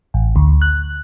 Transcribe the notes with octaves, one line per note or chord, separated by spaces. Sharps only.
A1
D2
F#6